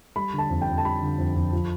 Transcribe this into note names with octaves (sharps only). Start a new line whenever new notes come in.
G3 B5
D3
A5
F2
G5
F2
A5
G3 B5
D3
F2
F2
F3